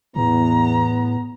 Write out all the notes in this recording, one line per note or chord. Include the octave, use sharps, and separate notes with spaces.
E2 A2 B3 A#5